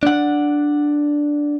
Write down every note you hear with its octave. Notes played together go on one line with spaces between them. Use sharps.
D4 F#5